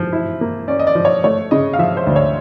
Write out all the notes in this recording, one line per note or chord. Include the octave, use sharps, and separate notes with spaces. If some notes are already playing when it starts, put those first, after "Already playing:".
Already playing: F3
E4
A#3
C#4 D5
D#5
D5
F3
C#5
A3 C#5
C#3 D#5
F5
F3 E5
C5
D2
C#5